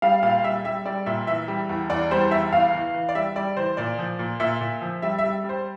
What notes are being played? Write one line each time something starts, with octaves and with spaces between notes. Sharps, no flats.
G3 F5
A#2 F5
G3 E5
G3 E5
G3 D5
A#2 E5
E3 E5
G3
E2
E2 D5
G3 C5
E2 E5
E2 F5
E3
E3
D5
G3 E5
G3 D5
E3 C5
A#2 D5
F3
A#2
A#2 E5
A#2
F3
G3 E5
G3 E5
G3
C5